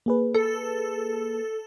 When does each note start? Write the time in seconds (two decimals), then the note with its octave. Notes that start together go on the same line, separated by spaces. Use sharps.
0.06 A#3 G#4 B4
0.34 A4